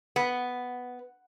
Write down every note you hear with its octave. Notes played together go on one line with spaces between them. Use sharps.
B3